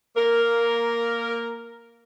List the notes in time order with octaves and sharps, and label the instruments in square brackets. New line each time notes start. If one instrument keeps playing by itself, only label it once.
[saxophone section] A#3 A#4